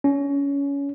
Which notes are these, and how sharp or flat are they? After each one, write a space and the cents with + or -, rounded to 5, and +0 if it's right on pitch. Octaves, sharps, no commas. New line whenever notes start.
C#4 +20